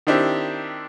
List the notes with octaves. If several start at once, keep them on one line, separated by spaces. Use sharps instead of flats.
D#3 C4 D4 E4 G4